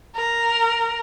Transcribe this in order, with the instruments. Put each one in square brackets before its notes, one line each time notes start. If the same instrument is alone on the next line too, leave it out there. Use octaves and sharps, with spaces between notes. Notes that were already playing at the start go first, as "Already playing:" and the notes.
[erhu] A#4